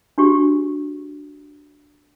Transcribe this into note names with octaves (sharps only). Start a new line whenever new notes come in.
D4 F#4 G4 C#6